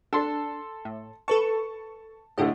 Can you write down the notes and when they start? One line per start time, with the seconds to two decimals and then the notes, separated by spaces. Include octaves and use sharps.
0.13 D4 A4 C6
0.85 A2
1.28 A4 B4 A5 C#6
2.38 A2 D3 A3 G4 D#5